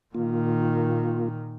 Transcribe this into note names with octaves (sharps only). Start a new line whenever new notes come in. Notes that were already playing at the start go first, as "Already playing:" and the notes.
A#2 D#3 A#3 F4